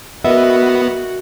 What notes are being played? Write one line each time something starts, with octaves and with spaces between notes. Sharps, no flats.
B3 F#4 A#4 D#5 E5